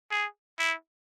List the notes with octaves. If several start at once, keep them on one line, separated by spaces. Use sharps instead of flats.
G#4
E4